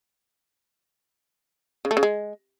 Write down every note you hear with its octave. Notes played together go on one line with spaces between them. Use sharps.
C#3
A3
C#3
G#3